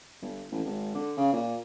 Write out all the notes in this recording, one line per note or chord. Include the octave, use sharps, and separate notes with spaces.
G1
A1
G#1
D3
C#3
A#2